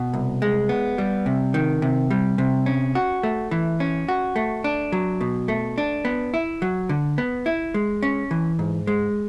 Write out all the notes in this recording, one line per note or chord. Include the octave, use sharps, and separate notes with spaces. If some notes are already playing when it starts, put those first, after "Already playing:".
Already playing: B2
C2
G#3
B3
G3
C3
D#3
C3
G3
C3
C#4
F#4
A3
E3
C#4
F#4
A3
D4
F#3
B2
A3
D4
B3
E4
F#3
D3
B3
E4
G#3
C#4
E3
G#2
G#3